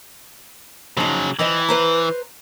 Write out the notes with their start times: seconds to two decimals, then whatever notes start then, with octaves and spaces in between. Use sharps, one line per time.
0.97 C#3 F3 F#3 D#4
1.39 E3 C5 D#5 G5
1.69 B4 C5 A#5